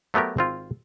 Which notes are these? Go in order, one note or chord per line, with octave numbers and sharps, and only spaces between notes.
F#3 A3 B3 G4 A#4
G#1 C4 F4